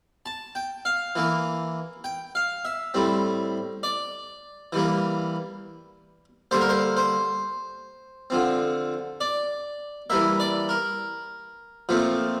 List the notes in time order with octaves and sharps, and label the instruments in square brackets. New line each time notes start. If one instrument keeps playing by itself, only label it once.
[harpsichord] A5
G5
F5
E3 A#3
G5
F5
E5
A2 G3 C4
D5
E3 G3 A#3
D3 G3 A#3 C5
A#4
C5
C5
D3 F3 C4
D5
E3 G3 A#3 E5
D5
A#4
A#2 F3 A3 C4